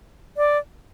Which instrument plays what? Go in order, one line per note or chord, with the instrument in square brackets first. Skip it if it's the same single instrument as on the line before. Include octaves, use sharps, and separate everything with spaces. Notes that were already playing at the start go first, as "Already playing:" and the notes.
[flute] D5